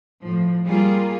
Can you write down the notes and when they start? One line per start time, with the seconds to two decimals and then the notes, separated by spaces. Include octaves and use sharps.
0.22 A2 F3
0.65 G3 A#3 F4 G#4